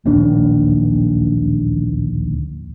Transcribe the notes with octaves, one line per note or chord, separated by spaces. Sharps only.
D1 A#1 D#2 D4